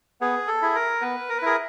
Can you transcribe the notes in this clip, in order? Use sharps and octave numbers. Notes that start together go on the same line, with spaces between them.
B3 G#4
A4
E4 G#4
A#4
B3 B4
A#4
B4
E4 G#4 A#4